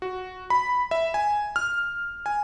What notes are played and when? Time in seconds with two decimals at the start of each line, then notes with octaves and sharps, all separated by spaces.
0.02 F#4
0.50 B5
0.91 E5
1.14 G#5
1.56 F6
2.26 G#5